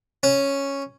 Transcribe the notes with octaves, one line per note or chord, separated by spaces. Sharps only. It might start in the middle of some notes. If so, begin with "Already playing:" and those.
C#4